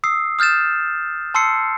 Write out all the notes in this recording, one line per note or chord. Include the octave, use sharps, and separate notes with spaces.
D#6 E6 C7
D#6 F6 G6 A6 E7
A5 C6 E6 C7 C#7